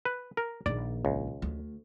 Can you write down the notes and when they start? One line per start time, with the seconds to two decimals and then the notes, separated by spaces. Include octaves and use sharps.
0.05 B4
0.37 A#4
0.66 A#1 D#3 D5
1.05 C#2
1.42 D2